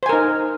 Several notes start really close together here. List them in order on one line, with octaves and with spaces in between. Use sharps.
C5 G#5 A#4 D#4